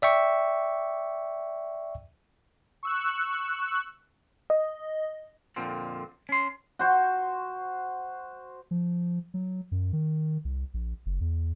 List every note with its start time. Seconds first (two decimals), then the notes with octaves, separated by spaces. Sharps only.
0.02 D5 E5 G5 C#6
2.83 C#6 E6 F#6
4.50 D#5
5.56 F2 A#2 D3 C4
6.29 C#4 C6
6.79 F#4 C5 C#6
8.71 F3
9.34 F#3
9.72 F#2
9.93 D#3
10.45 C2
10.74 A#1
11.06 F#1
11.21 E2